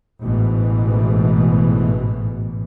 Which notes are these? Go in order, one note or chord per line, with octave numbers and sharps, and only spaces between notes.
A1 G#2 B2 E3